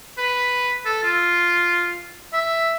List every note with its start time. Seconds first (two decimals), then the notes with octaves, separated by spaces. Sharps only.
0.18 B4
0.85 A4
1.03 F4
2.33 E5